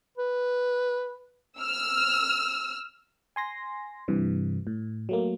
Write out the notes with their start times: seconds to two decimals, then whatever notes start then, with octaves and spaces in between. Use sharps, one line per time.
0.18 B4
1.58 E6 F6
3.36 G#5 C6 A#6
4.08 G2 C3 E3
4.67 A2
5.09 F#3 A3 A#3